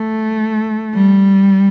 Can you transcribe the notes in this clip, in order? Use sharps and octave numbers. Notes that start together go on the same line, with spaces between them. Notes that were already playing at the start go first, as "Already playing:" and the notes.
Already playing: A3
G3